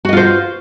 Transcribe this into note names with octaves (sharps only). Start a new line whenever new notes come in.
F4 F#4 C5 D#5